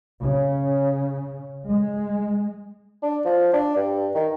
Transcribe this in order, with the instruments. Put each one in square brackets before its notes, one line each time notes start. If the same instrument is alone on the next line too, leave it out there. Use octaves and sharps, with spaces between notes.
[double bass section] C#3
G#3
[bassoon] D4
F3
D4
G2
D#3